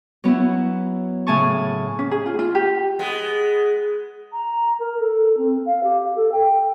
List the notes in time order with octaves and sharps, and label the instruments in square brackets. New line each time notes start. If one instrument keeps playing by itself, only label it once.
[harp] F#3 B3 C#4 E4
A2 C#3 A3 G#5 A5 C#6
[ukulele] C#4
G#4
F4
F4
G4
[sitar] G#3 B3
[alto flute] A#5
A#4
A4
C4
F5
G4
A4
G5